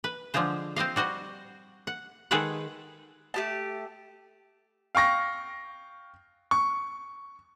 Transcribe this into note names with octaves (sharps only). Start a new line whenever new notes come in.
B4
D3 F3 G#3 F4 C5
C4 C5 D#5 F5
G3 F#4 C5 D#5
F#5
D#3 G#3 G#4 A4 B4 F#5
A3 G4 A5
F5 G5 C#6 A#6
C#6